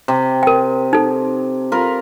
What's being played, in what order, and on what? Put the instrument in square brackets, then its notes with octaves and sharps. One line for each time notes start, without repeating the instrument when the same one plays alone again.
[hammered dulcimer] C3
[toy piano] A#4 G5
D#4 A4
[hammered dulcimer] F4 A#4 B5